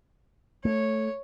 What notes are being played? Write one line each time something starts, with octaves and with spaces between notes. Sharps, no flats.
A3 C#5